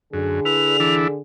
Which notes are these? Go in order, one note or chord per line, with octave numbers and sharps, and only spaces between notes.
F#2 D3 G#4
E4 B4 F7
E3 D4 E4